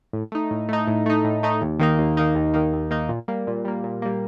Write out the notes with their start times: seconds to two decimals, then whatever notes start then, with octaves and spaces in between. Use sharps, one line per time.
0.13 A2
0.32 A3 D#4
0.51 A2
0.69 A3 D#4
0.87 A2
1.06 A3 D#4
1.24 A2
1.43 A3 D#4
1.62 D#2
1.80 D#3 A#3 D#4
1.98 D#2
2.17 D#3 A#3 D#4
2.35 D#2
2.54 D#3 A#3 D#4
2.73 D#2
2.91 D#3 A#3 D#4
3.09 A#2
3.28 G3 A#3
3.47 A#2
3.65 G3 A#3
3.84 A#2
4.02 G3 A#3